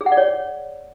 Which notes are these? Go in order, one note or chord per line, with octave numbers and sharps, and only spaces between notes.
G#4
F#5
D5
C#5